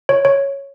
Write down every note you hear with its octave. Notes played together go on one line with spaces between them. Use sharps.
C#5
C#5